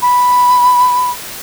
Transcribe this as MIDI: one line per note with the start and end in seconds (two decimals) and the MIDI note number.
0.02 1.10 83